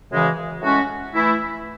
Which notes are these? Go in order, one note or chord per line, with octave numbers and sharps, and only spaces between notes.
F#2 C#3 E3 G#3
A2 G#3 C#4 F#4
E3 A3 E4